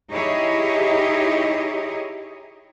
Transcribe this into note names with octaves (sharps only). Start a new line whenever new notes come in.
D#4 E4 G4 G#4 C#5 D#5